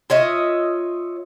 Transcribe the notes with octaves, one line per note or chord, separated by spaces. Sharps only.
F4 C#5 D#5 E5